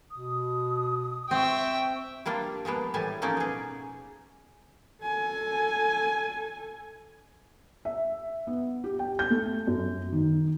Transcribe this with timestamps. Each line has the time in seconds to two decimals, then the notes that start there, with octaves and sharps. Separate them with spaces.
0.10 B2 D#6
1.31 C4 E5 G5 C#6
2.26 G3 A#3 D4 F4
2.65 F3 G#3 A#3 B3
2.94 A2 E3 G3 G#5 A5
3.22 F3 A#3 C#4 D#4 D5
3.37 B2 G#4
5.03 A4 G#5
7.85 E5
8.47 B3
8.84 G4
8.99 G5
9.19 G6
9.30 A3
9.67 F#2
10.12 D#3